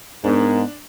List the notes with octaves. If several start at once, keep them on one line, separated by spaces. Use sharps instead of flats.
G#2 B3 D4 A#4